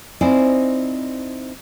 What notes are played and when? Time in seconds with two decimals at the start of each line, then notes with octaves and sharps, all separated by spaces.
0.21 C4 D#4 E4 C5 D5 G#5